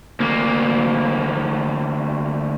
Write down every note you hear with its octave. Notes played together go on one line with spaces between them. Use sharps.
D2 A#3